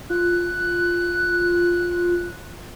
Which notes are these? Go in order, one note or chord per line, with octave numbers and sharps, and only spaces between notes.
F4 F#6